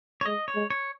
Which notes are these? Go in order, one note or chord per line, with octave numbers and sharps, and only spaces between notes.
C#5
G#3 D#5
C#5
G#3
C#5